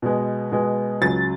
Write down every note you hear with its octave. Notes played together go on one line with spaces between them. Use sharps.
B2 G#3 B3
B2 G#3 B3
C#2 C#3 F#3 A6